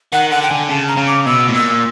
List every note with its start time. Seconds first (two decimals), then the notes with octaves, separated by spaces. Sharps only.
0.12 D#3 F#5
0.31 D3 F#5
0.42 G5
0.50 D3 G#5
0.69 C#3 A5
0.88 A#5
0.97 C#3
1.07 D6
1.26 B2 E6
1.48 A2
1.54 A#2 E6